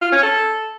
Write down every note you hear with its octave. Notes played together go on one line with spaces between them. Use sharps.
F4
C#4
A4